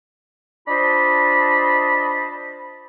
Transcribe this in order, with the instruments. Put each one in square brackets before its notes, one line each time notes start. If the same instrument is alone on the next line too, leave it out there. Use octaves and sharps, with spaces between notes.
[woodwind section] D4 F4 C5 D#5 A5 B5